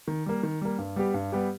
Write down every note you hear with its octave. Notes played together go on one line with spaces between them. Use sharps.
D#3
G3 A#3
D#3
G3 A#3
G2
G3 B3 G4
G2
G3 B3 G4